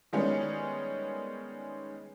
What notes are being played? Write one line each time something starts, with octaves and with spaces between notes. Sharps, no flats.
D#3 G3 G#3 B3 C#4